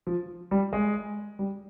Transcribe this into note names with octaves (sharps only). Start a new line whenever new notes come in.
F3
G3
G#3
G3